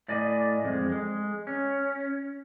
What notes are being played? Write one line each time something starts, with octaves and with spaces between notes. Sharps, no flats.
A2 D5 D#5 G#5
F2 G#3
G#3
C#4